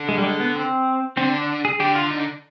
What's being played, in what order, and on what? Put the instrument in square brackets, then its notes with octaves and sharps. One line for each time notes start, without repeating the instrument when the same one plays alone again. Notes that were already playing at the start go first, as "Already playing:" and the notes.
Already playing: [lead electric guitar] D3
[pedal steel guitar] G#3
G3
G#3
B3
C4
[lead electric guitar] D3 [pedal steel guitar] C4
[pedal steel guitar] D4
G#4
[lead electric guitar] D3 [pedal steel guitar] G4
[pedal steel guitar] F4
D#4